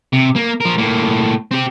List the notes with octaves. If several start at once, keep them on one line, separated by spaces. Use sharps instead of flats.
C3
A#3
F3 A#4
A2 A#3
C4 G4